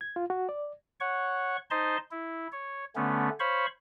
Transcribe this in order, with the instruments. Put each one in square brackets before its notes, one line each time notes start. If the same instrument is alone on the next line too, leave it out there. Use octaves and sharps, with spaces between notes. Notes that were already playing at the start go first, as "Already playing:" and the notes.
[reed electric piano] G#6
F4
F#4
D5
[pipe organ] C#5 F#5 C#6
D#4 C5 D#5 A5 C6
E4
C#5
D3 A3 B3 C#4
C5 C#5 F5 B5 C#6